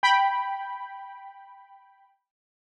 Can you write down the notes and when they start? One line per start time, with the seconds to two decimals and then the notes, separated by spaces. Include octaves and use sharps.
0.03 G5 B5